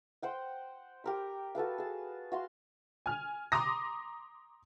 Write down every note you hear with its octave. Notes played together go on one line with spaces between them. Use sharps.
C5 F#5 G5
G4 A#4 B5
F#4 A4 B4 F5
G#4 A5
F#4 F5 C6
G#5 F6
A#5 C6 D6 D#6 A#6